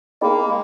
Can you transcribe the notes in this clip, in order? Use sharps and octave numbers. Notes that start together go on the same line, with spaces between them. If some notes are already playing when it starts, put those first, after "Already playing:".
A#3 D#4 G#4 D#5 G5 B5
G#3